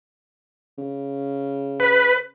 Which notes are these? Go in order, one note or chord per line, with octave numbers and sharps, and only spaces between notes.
C#3
B4